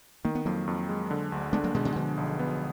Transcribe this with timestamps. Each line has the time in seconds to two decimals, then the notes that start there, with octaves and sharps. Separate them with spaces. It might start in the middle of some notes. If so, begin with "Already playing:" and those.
0.24 D#3 A#3
0.35 B3
0.45 F2 F#3 A#3
0.67 F2
0.89 G#3
1.11 D3
1.32 D2
1.53 G#3 B3 D4
1.64 F#3 A#3
1.75 B2 D#3 G#3
1.85 B2 D#3
1.96 B2 D3 F3
2.17 B1
2.39 B3